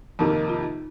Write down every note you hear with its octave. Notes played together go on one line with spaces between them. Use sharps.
F2 C3 D#3 A#3 D#4
F4